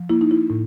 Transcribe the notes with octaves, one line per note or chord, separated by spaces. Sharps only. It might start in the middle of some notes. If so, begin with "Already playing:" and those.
Already playing: F3
A#3 E4
D#4
E4
A2